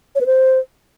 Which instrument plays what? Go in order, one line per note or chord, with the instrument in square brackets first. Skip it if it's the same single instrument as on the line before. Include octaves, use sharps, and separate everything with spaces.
[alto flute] C#5
B4
C5